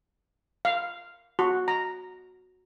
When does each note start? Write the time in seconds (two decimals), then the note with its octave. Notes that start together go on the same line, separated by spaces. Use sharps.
0.65 F5
1.39 F#4
1.68 A#5